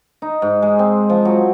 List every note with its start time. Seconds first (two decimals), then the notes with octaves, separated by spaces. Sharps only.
0.22 D#4
0.42 G#2
0.62 G#3
0.79 C4
1.10 F3
1.25 F#3